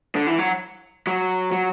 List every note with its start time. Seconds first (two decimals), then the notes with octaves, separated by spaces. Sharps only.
0.15 D3
0.27 E3
0.38 F#3
1.07 F#3
1.52 F#3